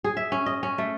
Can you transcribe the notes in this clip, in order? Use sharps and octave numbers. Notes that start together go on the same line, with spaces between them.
G#4
E5
C#4
D#5
C#4
A3